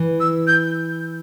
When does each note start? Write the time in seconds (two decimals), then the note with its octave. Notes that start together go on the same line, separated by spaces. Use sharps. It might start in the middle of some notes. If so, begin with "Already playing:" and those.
Already playing: E3
0.20 E6
0.47 G6